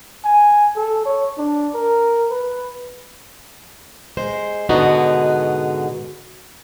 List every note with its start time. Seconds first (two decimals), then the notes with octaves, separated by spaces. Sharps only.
0.24 G#5
0.76 A4
1.05 C#5
1.38 D4
1.74 A#4
2.31 B4
4.17 G#3 C5
4.69 G#2 B2 D3 B3 D#4 F#4